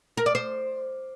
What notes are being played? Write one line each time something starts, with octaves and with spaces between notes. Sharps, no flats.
A#4
D5
C5